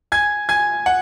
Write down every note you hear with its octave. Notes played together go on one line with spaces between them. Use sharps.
G#5 G#6
G#5 G#6
F#5